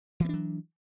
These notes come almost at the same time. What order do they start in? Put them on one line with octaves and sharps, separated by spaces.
E3 B3 D4 F#3